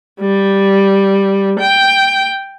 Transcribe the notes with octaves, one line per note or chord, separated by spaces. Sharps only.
G3
G5